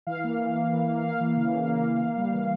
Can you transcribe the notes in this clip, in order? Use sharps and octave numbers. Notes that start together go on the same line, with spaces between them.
E3 F5
A#3
E3
A#3
E3
A#3
A#3 F5
E3
C#3
C#3
A#3
E3
A#3
G3
E3